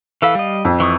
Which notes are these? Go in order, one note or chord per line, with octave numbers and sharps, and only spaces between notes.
E3 A4 F5 B5
G3 D#5
F2
E3 C#6 D#6